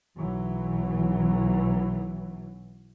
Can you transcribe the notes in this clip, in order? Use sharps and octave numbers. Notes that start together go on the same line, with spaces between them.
B1 E3 F#3